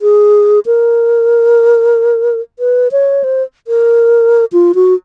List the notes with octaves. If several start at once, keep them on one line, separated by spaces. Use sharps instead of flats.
G#4
A#4
B4
C#5
C5
A#4
F4
F#4